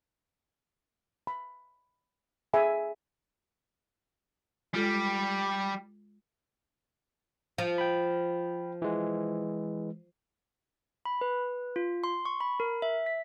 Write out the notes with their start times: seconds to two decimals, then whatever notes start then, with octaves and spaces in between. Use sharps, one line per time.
1.27 B5
2.53 G#4 E5 G#5 B5
4.74 G3 G#3 F4 A4
7.58 F3
7.78 G5 B5
8.82 E3 G#3
11.05 B5
11.21 B4
11.76 F4
12.04 C6
12.25 C#6
12.40 B5
12.60 A#4
12.82 E5
13.06 B6